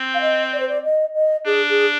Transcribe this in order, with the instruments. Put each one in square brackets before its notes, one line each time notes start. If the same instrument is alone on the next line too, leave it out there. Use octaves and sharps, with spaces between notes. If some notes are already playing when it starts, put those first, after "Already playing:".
Already playing: [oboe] C4
[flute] F5
D#5
D5
C5
D5
D#5
D#5
[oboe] D4 [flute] G#4
[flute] G#4